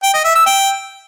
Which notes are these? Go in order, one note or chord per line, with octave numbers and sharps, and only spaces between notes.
G5
D#5
E5
E6
G5